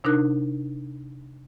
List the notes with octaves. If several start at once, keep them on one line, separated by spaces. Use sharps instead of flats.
C3 D4 D#4 A#4 F#6